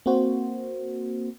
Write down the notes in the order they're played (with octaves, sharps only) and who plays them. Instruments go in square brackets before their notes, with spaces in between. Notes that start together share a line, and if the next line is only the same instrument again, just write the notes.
[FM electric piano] A#3 C4 F#4 C5